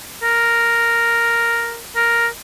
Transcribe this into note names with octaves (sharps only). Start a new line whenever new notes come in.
A#4
A#4